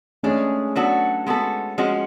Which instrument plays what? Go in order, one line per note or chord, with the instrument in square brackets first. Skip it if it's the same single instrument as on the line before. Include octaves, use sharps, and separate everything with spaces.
[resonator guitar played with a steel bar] G#3 D4 G#4 [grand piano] A3 C#4
[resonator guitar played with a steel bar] F#3 B3 D4 F#4 A4
G#3 B3 F#4 A4
F3 G#3 C#4 F#4